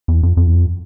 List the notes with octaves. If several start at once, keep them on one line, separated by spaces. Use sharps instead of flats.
E2
F2
F2
E2
F2